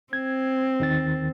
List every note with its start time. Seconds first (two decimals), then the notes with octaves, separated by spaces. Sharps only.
0.13 C4 G#6
0.80 D#2 D#3 A6